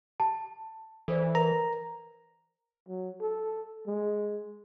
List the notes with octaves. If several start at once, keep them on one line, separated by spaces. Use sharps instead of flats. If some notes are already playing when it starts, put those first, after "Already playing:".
A5
E3 A4 C5 D5
A#4 B4 A#5
F#3
A4
G#3